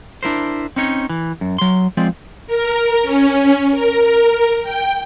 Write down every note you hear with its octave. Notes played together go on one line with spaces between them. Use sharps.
D4 E4 A#4 C5
C4 C#4 D#4 C#5
E3
F#2
F#3 C6
F3 G#3 C4 D5
A#4
C#4
A#4
G5